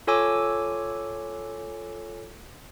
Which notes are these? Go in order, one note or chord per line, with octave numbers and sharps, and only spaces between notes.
F4 A4 C#5 G#5 D6 E6